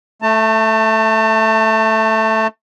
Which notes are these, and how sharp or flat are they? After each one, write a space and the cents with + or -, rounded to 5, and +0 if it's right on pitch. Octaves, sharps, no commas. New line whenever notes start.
A3 +0 A5 +30